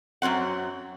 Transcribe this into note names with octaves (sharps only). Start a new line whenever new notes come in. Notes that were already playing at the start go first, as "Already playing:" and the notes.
F#2 F#3 C4 F#5